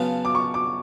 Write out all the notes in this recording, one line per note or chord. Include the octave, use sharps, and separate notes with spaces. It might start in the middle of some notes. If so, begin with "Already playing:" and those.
Already playing: C#3 F#3 B3 F4 A5
D6
C#6
D6